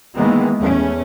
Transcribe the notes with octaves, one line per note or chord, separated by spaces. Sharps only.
D#3 E3 G#3 A#3 B3
E2 A3 C#4